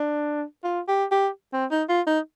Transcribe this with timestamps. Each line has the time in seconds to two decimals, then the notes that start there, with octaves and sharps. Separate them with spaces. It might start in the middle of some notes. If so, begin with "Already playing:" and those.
Already playing: D4
0.64 F4
0.88 G4
1.11 G4
1.53 C4
1.71 D#4
1.89 F4
2.07 D#4